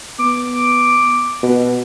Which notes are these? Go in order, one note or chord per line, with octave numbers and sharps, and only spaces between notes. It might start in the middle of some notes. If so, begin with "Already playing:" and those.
B3 D6
B2